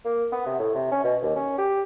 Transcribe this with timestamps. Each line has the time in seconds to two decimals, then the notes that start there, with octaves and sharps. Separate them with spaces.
0.05 A#3
0.32 B3
0.46 C3
0.59 A2
0.75 C3
0.92 C#4
1.04 B2
1.22 D#2
1.36 C#4
1.58 G4